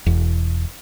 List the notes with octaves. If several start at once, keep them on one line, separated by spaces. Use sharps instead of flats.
E1 E2